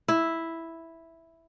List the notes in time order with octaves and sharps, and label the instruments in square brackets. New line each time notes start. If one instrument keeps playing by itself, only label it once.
[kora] E4